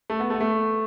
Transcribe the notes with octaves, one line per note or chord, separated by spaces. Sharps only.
A3
B3
A3
B3
A3